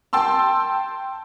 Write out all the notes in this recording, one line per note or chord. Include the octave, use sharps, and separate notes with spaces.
G5 A5 C6 E6